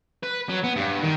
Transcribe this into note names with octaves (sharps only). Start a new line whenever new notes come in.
B4
F#3
B3
G2
D#3